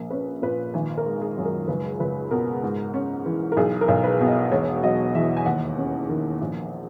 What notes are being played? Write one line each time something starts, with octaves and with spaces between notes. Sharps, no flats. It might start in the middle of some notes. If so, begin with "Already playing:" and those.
Already playing: A#1 A#4
C#4 B4
A#2 B4
G#1 G#5
A#4
G#3
G#4
F#2
A#4
C#2 B4
C#2 B4
B2 A#4
G#2
C#4
E3
A#4
B1 G#4
A#4
B1
B4
B2
D#5
E1 C#5
F#3 D#5
E2 E5
G#5
D#2 F#5
C#4
D#3
A#1